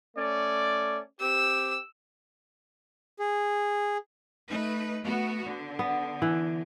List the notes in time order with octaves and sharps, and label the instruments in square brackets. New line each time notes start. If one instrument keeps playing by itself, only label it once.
[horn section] A3 C#4 D5
[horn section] C4 G4 [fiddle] E6
[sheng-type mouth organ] G#4
[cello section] A3 D#4 B4
A3 B3 F#4
D3
[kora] B3
E3